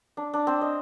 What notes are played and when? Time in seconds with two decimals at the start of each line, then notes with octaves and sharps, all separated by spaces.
0.17 D4
0.34 D4
0.47 C4
0.61 D#5